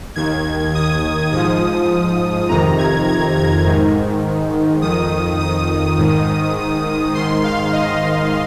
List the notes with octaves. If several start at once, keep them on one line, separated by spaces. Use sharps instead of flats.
D#2 D#3 G#6
D#6
G#2 F3 D#6
F2 C3 D#3 A#5
G#6
G#6
G#6
G#2 D#3
F2 D#3 D#6
D#6
G#2 D#3
G#2 D#3 C6
F5
D#5